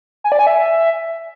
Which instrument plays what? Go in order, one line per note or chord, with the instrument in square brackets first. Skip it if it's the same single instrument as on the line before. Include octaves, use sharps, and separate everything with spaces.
[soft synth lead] G#5
D5
G#5
E5